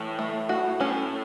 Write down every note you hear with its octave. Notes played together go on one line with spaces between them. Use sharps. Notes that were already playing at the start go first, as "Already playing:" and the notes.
Already playing: A2 E3
A3
F#4
A2 C#4